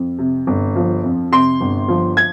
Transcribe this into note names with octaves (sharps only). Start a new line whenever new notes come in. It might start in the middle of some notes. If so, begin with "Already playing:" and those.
Already playing: F2
C3
G1
F3
F2
C3 C6
G1
F3
G#6